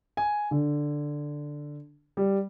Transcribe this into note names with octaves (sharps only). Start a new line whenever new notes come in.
G#5
D3
G3